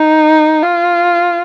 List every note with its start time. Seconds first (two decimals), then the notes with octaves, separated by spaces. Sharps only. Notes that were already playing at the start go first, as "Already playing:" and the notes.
Already playing: D#4
0.63 F4